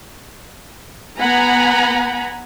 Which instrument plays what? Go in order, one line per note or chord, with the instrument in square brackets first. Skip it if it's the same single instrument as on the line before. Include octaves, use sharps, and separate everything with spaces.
[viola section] B3 F#5 G#5 A#5 B5